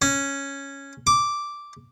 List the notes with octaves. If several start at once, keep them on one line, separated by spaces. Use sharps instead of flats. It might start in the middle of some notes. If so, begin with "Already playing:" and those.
C#4
D6